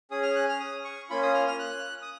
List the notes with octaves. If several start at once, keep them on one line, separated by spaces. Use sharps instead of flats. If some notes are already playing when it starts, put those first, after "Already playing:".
C#4 G#4 D#6
F6
F#6
F6
D#6
C#6
A#3 C#4 F4 B5
D#6
F6
F6
F#6
D#6